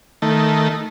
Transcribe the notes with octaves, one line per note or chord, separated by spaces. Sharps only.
D#3 A3